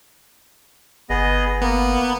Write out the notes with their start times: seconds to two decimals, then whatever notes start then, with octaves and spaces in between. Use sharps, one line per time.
1.10 G1 B3 G#4 D#5
1.61 A#3 B3